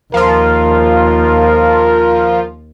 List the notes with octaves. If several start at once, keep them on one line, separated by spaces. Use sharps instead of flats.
D#2 F3 F4 A#4